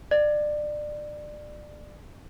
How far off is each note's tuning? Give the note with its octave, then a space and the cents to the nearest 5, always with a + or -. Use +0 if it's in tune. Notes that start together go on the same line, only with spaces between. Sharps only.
D5 +25